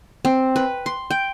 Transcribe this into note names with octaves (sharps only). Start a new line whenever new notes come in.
C4
B4
C6
G5